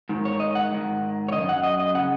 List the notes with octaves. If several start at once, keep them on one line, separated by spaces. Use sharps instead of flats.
G#2 D#3
C#5
D#5
F#5
G#2 D#3
C#5
F#2 C#3 D#5
F#5
D#5
D#5
C#3 F#5